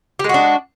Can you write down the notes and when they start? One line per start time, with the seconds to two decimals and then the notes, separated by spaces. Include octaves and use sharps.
0.19 G4
0.24 G#3
0.29 F#4
0.34 D4